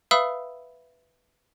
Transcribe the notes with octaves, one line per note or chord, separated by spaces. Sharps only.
B4 E5 F5 B5 D#6 E6